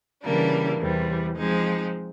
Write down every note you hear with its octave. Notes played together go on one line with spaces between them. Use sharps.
C#3 E3 G3 A#3 D4
E2 C3 E3 G3
F3 G#3 C4 D#4